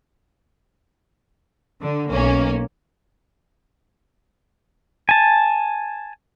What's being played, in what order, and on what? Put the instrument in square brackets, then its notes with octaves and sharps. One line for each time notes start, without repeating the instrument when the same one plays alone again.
[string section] D3
B1 A#3 C#4
[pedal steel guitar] G#5 A5